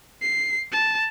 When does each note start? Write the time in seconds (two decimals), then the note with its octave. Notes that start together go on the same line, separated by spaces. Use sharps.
0.22 C7
0.72 A5